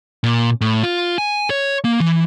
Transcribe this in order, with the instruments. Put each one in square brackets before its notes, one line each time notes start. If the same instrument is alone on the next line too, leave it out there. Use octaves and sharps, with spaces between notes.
[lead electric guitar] A#2
A2
F4
G#5
C#5
A#3
E3